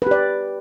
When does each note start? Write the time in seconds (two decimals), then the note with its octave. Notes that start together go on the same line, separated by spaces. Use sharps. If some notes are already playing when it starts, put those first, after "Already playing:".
0.02 B4
0.07 G4
0.11 D5